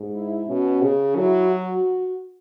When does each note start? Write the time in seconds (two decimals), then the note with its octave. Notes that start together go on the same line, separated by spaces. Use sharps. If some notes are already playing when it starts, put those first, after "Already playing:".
Already playing: G#2
0.14 E4
0.48 B2 C#4
0.82 C#3
1.16 F#3 E4
1.49 F#4